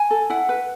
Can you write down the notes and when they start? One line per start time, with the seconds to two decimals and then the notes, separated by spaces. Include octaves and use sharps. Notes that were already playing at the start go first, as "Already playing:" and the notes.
Already playing: G#5
0.11 A4
0.30 E4 F#5
0.49 B4